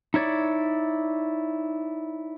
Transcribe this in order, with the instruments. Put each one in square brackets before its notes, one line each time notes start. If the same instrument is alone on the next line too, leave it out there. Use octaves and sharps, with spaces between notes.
[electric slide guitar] D#4 E4 C#5 D5